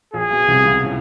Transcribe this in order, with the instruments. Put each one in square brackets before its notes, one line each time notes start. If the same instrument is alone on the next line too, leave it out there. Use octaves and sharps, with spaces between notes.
[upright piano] A#1 A#2 [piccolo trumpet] G#4
[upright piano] B1 B2
C2 C3
C#2 C#3
A2